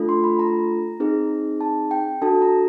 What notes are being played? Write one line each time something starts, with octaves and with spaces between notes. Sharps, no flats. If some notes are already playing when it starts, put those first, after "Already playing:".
Already playing: A3 D4 F4 A4
C6
B5
A#5
C4 D#4 G#4
A5
G5
D4 F#4 A4 A5
A#5